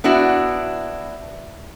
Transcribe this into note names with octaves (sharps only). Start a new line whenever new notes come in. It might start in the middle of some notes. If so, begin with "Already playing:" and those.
B3 D4 E4 F#4